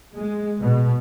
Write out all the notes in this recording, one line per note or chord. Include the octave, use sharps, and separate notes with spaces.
G#3
B2